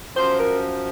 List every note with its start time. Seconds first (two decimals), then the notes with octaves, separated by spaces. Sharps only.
0.16 F#2 F3 C5
0.38 A#4